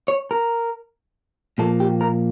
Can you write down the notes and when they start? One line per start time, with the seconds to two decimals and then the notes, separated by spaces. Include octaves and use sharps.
0.08 C#5
0.31 A#4
1.58 A#2 F3 A#3 A4
1.80 G4
2.01 A#4